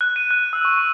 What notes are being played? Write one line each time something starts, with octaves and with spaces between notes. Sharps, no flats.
F#6
D#7
F#6
E6
C#6